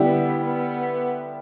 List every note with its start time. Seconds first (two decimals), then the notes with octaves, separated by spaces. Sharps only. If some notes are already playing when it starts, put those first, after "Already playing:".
Already playing: D3 G3 B3 E4 G4
0.44 B3